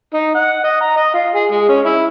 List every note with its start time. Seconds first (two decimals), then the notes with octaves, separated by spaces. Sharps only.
0.14 D#4
0.35 F#5
0.64 D#5
0.80 A#5
0.96 D#5
1.14 F4
1.34 G#4
1.51 G#3
1.69 C#4
1.85 E4